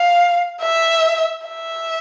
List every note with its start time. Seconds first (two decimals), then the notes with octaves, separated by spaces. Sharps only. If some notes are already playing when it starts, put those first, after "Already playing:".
Already playing: F5
0.62 E5
1.47 E5